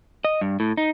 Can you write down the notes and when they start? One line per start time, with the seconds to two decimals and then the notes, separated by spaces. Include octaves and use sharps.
0.25 D#5
0.41 G2
0.60 A2
0.77 D#4